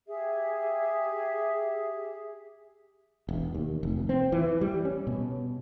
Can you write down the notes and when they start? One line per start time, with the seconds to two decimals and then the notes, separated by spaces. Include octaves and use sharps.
0.07 G4 G#4 E5
3.29 E1
3.54 D#2
3.83 F1
4.09 C4
4.32 E3
4.61 G3
4.85 C#4
5.07 B2